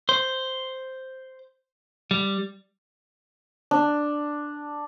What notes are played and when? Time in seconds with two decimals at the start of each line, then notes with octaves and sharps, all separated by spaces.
0.09 C5
2.11 G3
3.71 D4